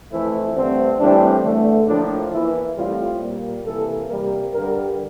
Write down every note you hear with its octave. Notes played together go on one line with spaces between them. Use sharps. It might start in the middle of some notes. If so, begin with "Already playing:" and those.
F2 E3 A3 C4 E4
G2 D3 A3 C4
A2 E3 G3 C4 D4
E2 D3 A3
A2 F3 A#3 D4
E2 E3 A#3 E4
A2 G3 C4 F4
A#2 G3 A#3
C3 E3 A#3 A4
C3 G3 A#3 A#4
G2 D3 G3 A#4